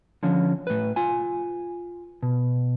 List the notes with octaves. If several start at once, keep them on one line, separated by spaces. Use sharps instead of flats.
D3 F3 C#4
A2 B4
F4 G#5
B2